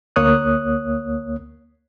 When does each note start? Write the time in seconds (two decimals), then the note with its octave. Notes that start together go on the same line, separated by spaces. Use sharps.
0.16 D2 A#3 C#5 D#6 F#6